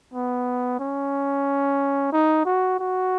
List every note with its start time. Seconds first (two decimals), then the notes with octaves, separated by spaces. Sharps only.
0.14 B3
0.80 C#4
2.12 D#4
2.45 F#4
2.79 F#4